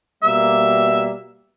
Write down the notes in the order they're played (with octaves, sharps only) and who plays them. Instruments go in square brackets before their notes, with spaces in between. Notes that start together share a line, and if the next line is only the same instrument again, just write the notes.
[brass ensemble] B2 G3 A#3 [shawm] E5